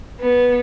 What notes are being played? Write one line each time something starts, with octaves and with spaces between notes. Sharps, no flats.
B3